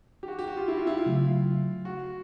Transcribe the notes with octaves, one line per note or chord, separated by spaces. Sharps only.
G4
F#4
G4
F#4
F4
E4
F4
E4
F4
C#3 F#3 A3
F#4